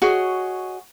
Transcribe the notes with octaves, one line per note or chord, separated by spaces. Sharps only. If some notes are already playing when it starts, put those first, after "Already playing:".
F#4 G#4 C#5 D#5